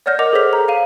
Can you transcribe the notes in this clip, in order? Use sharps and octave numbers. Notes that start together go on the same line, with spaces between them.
C#5 D5 F#5 F6 G6 A#6
A#4 D#5 F#5 D6 F7
G#4 A4 C5 C#5 B6 F7
A#5
F5 D#7